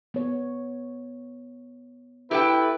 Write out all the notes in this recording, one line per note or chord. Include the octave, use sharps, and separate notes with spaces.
B3 C#5
E4 G4 A4 B4 G5